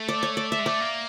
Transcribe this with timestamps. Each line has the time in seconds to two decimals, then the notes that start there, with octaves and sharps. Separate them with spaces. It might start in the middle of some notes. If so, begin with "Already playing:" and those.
Already playing: A3
0.08 D5
0.23 C#5
0.37 D5
0.52 E5
0.59 G#3
0.66 A3 D5
0.80 A#3